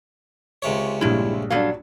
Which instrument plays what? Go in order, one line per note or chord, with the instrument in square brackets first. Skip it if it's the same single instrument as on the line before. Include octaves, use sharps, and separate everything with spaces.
[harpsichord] C#2 C3 C#5
[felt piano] A#1 G2 [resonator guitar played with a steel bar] G3 E4
[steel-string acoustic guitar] F#3 D4 [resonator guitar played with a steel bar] G3 A4 F5